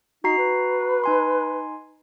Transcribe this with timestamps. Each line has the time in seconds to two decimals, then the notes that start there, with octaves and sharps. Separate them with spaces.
0.24 D#4 F#4 A#5 C7
0.38 B4
1.04 D#4 G#5 C6